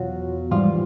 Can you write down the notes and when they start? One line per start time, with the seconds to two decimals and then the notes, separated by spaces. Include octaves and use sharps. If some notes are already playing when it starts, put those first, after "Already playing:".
Already playing: E2 B2 F3 F#3 F4 F#4
0.51 G#2 E3 F3 G3 F4